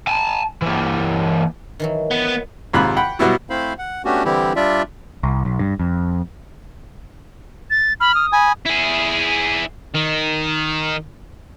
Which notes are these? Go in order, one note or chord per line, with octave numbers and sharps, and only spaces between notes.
G#5 A5
E3 A#3
D#3 E3 F#3
B3
D#2 G#2 C3 F4 B5 F#6
F#5 G5 B5
B2 F#3 G3 B3 E4 F#4
A3 C4 E4 C5 F5 B5
F#5
A3 B3 C#4 D4 F#4 G4
D3 E3 G3 C4 E4 G4
G3 D4 F4 D5 E5
C2
B1
G2
F2
A6
B5 F6
D#6
G#5 B5
E4 G#4
D#3